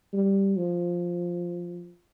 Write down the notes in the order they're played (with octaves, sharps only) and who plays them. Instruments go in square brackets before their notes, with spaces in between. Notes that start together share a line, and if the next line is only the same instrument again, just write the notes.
[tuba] G3
F3